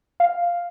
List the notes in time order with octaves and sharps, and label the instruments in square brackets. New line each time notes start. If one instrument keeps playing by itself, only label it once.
[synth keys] F5